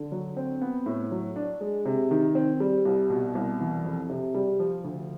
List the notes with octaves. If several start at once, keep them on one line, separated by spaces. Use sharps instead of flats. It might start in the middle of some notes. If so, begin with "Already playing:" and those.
Already playing: D3
F#3
C4
B3
A2
F#3
D4
G#3
C3
D#3
C4
G3
C2
B2
C2
E3
F2
C3
G3
F3
D2